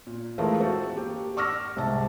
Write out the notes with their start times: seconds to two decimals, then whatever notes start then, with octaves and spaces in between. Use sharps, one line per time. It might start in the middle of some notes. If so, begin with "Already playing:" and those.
0.07 A#2
0.38 E3 G#3 A3 C4 F4 A#4
0.60 C4 F#4 A4
0.95 A#3 G4
1.37 C#6 D6 E6 F6 A#6
1.76 C2 G#2 C3 A5